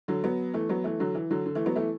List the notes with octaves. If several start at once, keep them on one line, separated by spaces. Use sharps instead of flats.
D3 F#3
F#3 B3
E3 A3
F#3 B3
E3 A3
D3 F#3
E3
D3 F#3
D3
E3 A3
F#3 B3
E3 A3